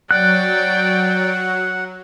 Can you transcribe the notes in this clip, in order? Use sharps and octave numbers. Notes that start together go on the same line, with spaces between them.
F#3 D5 F#5 G5 F#6